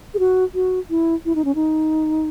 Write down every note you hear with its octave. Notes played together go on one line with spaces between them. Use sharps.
G#4
F#4
F#4
E4
E4
D#4
C#4
D#4